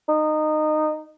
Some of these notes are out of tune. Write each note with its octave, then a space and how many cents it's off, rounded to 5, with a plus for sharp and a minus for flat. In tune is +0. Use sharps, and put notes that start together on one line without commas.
D#4 -20